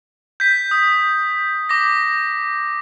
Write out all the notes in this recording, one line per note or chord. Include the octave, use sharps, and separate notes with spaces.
G6 B6
D#6
D6 A#6